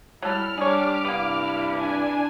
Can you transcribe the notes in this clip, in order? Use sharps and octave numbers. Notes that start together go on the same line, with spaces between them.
F#3 G3 E4 A4 F6
G3 D4 G4 G#4 C#5 D6 F6
G2 C3 A#3 B3 E4
D4 G#5